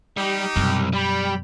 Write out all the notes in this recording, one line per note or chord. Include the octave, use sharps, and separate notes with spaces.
G3 D#4 G4
C2 F#2 B2
G3 D5 G5 B5